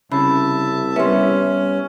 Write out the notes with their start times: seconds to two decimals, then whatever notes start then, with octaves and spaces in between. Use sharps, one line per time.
0.12 C2 C#3 E5 A5 B5
0.96 G3 B3 C#4 E5 C6